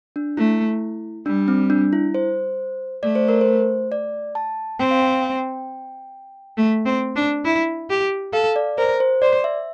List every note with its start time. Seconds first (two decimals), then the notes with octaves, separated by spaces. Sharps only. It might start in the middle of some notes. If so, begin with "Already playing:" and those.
0.16 D4
0.37 A3 E4
1.26 G3 D4
1.48 C4
1.70 D4
1.93 E4
2.14 C5
3.03 A3 D5
3.15 C5
3.28 A#4
3.41 C5
3.92 D5
4.35 A5
4.79 C4 G5
4.91 F5
5.03 G5
6.57 A3
6.86 C4
7.16 D4
7.45 E4
7.90 G4
8.33 A4 F5
8.56 D5
8.78 A#4 C5
9.00 C5
9.22 C5 D5
9.44 E5